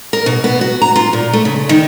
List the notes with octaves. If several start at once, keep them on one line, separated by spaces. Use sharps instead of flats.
A#4
B2
B3
F#4
A#5
F4
A#2
A3
C#3
D#3